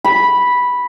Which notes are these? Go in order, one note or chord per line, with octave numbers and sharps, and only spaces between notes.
B5